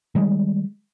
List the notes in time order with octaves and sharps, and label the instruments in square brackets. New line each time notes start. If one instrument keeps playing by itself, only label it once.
[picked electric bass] D#3 G3 G#3